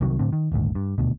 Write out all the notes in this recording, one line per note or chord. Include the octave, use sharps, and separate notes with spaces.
C2 C3 D#3 F#3
A2 D3 C4
D#3
D#1 G#1 D2 G#2
G2
D#1 D2 B2